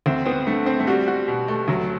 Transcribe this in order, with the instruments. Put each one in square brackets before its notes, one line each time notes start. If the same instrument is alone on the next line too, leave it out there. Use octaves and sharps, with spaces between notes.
[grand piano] D2 [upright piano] C4
[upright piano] B3 [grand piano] C4
[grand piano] D3 [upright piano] A3
[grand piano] C4
[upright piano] A3
[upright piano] G3 [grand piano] F#4
[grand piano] F#4
B2
A3
[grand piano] D2 [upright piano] F#3